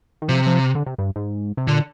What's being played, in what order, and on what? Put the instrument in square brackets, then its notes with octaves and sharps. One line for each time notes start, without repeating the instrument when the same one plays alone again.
[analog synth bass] D#3
[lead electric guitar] C3 [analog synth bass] F3
[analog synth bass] F3
D3
C3
G2
G#2
C3
[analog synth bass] A#2 [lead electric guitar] D3